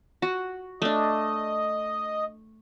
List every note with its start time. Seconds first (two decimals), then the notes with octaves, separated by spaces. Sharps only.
0.22 F#4
0.82 A3 D4 D#5